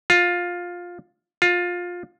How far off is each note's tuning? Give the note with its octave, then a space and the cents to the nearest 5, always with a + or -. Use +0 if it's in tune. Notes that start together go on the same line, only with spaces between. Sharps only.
F4 +15
F4 +20